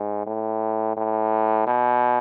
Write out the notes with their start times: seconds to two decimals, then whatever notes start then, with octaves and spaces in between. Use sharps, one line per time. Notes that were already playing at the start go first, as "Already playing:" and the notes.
Already playing: G#2
0.26 A2
0.97 A2
1.67 B2